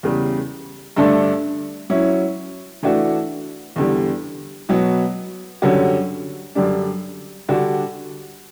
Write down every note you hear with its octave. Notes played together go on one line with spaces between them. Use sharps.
E2 C#3 G3
G2 D3 A3 D4 A4
F#3 C#4 E4
E3 A3 D4 F#4
E2 D3 G3
B2 F#3 B3
F#2 D3 G3 C#4 F#4
F#2 D3 G3 D4
D3 G3 D4 F#4